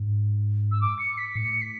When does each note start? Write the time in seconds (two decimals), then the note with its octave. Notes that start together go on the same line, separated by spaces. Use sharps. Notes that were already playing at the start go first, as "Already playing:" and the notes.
Already playing: G#2
0.72 E6
0.81 D6
0.99 C#7
1.18 B6
1.35 A2 C#7
1.62 B6